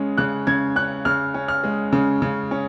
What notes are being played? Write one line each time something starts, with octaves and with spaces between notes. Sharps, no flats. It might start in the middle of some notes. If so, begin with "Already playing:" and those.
Already playing: C#3 G#3 C#4
C#3 F#6
C#3 G#6
C#4 F#6
C#3 F6
C#4
F6
G#3
C#3
C#3
C#4